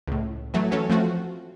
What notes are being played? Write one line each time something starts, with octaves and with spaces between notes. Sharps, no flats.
C#2 A2
E3 F#3 A3
E3 F#3 C#4 A4 C#5
F3 A3 C4 F4 F#4